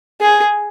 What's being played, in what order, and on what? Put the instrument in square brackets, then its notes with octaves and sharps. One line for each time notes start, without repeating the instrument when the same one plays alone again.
[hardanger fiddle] G#4